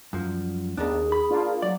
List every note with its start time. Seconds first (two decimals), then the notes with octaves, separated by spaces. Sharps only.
0.13 F#2 F3 G3
0.77 D#2 A#3 B3 D4 G#4
1.12 B5
1.30 A#3 D4 F4
1.62 F#3 D5